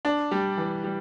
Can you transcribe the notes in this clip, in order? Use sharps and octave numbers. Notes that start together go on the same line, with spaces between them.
D4
G3
E3
G3